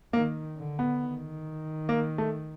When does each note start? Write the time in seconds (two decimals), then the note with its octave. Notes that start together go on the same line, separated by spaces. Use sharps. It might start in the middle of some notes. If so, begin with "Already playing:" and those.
0.13 D#3 A#3
0.57 D3
0.79 B3
1.01 D#3
1.89 A#3
2.18 A3